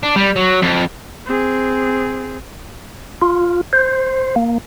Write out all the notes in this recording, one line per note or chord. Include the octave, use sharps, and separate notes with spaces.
D4
G3
F#3
F2
C4 G#4
F4
C5
A#3